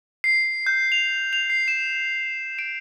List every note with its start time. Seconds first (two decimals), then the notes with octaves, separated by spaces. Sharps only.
0.24 C7
0.66 G6
0.92 F7
1.33 F7
1.50 C7
1.68 E7
2.59 D7